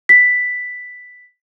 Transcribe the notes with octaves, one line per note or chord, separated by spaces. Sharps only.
B6